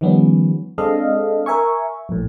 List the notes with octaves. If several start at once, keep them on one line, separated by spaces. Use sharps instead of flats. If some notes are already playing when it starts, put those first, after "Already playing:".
D#3 F3 G3 B3 C#4
G#3 C4 D4 A4 D#5 F5
A#4 E5 G#5 C#6
A#1 A2